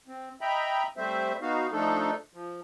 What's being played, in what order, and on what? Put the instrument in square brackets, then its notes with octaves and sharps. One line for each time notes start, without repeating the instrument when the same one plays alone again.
[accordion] C4
D#5 E5 G5 A#5 B5
G3 A3 C4 C5 E5
B3 D#4 F#4 F5
F3 A3 D4 D#4 A4
F3